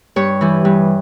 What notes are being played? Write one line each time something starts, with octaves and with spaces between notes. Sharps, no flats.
G2 C#5
E3 G3
G2